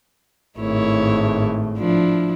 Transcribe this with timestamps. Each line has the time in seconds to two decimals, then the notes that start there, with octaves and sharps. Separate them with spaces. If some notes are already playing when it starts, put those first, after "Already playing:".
0.58 G#1 A2 A3 E4 C#5
1.78 F3 D4 E4